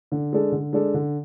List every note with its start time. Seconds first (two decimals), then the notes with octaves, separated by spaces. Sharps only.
0.12 D3
0.33 G#3 D4 A4
0.52 D3
0.73 G#3 D4 A4
0.94 D3